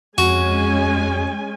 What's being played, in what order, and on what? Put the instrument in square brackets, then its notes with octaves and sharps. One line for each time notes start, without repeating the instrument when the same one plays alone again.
[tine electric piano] F2 [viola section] G#3 C#4 G#5 [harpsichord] F#4